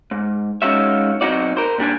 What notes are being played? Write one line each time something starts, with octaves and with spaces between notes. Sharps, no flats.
G#2
G#3 C#4 D#4 F4 F#4 E5
B1 F#3 C4 D#4 F#4 D5
A#4 C5
A#2 G3 D4 G#5